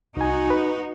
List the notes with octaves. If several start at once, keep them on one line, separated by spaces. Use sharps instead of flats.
C2 D#4 F#4 G#5
B4